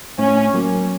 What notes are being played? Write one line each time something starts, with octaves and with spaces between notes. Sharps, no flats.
A2 C#4
F#3 A#3